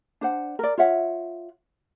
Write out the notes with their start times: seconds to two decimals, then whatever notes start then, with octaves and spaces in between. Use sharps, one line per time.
0.21 D4 C5 F#5
0.59 A#4 D5
0.78 F4 C#5 E5 F#5